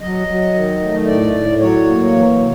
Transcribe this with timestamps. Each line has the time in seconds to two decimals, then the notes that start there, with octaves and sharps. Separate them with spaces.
0.01 F#3 D#5
0.27 F#3
0.53 D#3
0.80 A3
1.06 A2 D5
1.33 A2
1.59 F#3 C#5
1.86 A#3
2.13 E3
2.39 C3